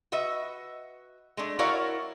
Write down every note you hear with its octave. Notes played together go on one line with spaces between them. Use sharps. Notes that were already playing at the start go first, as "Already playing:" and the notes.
F#4 B4 D#5 E5
G#3 A3 D4
E4 F#4 A#4 C#5 D5 F5